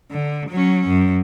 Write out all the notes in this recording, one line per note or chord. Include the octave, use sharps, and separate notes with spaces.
D3
F#3 C#4
F#2